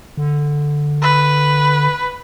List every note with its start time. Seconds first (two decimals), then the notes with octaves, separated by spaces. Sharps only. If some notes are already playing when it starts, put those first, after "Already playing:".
0.17 D3
1.02 B4